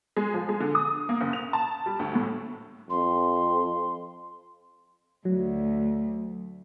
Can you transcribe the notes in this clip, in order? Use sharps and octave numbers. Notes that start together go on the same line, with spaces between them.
G#3
F3
G#3
D3
D#6
A#3
F#1
F7
A5
G3
D2
A2
F2 C6
D2 F#3